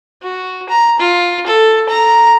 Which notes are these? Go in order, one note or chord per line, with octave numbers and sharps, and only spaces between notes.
F#4
A#5
F4
A4
A#5